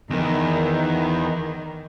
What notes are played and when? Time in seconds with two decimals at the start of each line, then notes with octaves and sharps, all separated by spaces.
0.10 E2 D#3